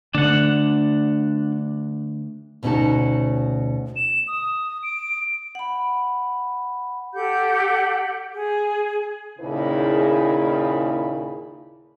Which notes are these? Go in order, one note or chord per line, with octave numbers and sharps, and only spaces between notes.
D3 A3 D4 F#5
D2 B2 C#4 D#4 F#4 A5
E7
D#6
D7
F#5 B5
G4 A4 F#5 G6
G#4
D#2 A#2 C#3 E4 G#4 B4